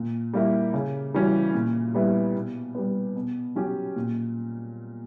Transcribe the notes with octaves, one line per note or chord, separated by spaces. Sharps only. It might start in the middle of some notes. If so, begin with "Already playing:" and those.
Already playing: A#2
G3 A#3 E4
C#3
E3 G3 C#4 F#4
A#2
G3 B3 E4 G4
B2
G3 B3
B2
F#3 C#4 G4
A#2